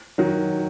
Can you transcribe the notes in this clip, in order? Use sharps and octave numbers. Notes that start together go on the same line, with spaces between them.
D#3 F#3